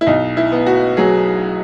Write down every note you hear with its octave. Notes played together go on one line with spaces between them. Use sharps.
E4
B1 D#4
E4
B3
F#4
F#3 G#4